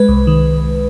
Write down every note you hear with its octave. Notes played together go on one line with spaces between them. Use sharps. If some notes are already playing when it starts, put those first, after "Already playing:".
Already playing: G#3 B4
C2
D#3